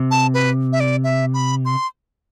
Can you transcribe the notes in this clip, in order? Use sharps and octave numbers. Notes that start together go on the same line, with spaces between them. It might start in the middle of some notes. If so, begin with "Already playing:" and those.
Already playing: C3
A5
B4
E5
D5
E5
B5
C6